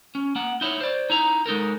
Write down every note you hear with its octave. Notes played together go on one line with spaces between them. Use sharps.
C#4
A#3 F#5
D#4 E4 C#5
C5 D5
D#4 E4 A#5
G#3 D#4 A4 A#4